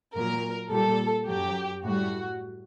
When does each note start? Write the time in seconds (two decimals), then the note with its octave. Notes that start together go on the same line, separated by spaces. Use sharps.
0.13 A#2 F#3 A#4
0.69 A#2 G3 A4
1.26 F#2 F#3 G4
1.82 A2 G3 F#4